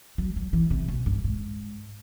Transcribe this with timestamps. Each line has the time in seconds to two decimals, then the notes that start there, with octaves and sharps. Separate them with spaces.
0.18 F#3
0.36 F#3
0.53 E3
0.71 C3
0.88 B2
1.06 G2
1.24 G#2